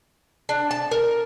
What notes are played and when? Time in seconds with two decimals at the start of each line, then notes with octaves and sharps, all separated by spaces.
0.49 D4
0.71 A5
0.91 A#4